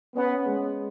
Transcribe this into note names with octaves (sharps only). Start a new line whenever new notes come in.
B3 C#4
G#3